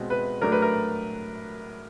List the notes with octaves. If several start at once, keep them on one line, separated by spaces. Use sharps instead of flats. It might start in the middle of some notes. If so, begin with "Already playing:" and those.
Already playing: B2 G#3 C4
B4
A2 F#3 A3 D4 A#4
B4
A#4